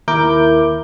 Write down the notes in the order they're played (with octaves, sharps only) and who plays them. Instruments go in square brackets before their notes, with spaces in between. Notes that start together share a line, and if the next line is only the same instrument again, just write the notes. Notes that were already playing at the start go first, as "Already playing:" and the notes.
[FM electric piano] D#2 E4 A#4 D6 G6